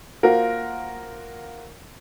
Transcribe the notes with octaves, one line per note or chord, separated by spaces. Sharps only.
A#3 F4 F#4 A#4 C5